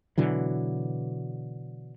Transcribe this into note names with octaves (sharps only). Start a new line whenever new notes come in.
B2 D3 E3 F#3